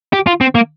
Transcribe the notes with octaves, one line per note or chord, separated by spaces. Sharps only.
G4
F4
C4
A#3